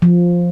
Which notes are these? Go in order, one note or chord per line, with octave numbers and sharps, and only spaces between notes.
F3